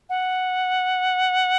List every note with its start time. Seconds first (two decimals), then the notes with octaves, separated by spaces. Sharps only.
0.09 F#5